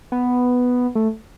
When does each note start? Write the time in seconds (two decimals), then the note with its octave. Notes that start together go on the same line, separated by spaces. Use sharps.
0.12 B3
0.95 A3